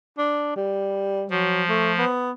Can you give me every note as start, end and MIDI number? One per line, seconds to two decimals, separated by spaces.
0.18 0.52 62
0.56 1.25 55
1.30 2.05 53
1.30 1.63 54
1.69 1.93 57
1.99 2.31 59